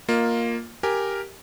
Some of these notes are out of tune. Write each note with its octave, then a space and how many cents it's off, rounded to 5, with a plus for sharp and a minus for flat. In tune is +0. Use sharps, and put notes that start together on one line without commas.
A#3 +0 F4 +10 D#5 -5
G4 +0 A#4 +0 G#5 +0